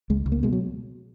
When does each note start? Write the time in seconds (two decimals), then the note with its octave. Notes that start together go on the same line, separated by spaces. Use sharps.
0.10 C#2 G#3
0.26 C#2
0.32 A#3
0.43 B2 G#3
0.53 F#3